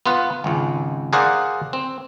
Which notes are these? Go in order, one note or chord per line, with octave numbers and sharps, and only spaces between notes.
B3 F4 B4
G#1 C#2
G#4 A#4 C5 D5 F5 F#5
C4